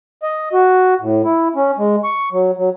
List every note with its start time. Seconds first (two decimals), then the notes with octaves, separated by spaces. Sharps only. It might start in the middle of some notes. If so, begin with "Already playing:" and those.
0.23 D#5
0.53 F#4
1.01 A2
1.25 E4
1.56 C#4
1.79 G#3
2.04 C#6
2.32 F#3
2.57 F#3